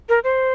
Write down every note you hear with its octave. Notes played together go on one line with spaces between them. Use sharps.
A#4
C5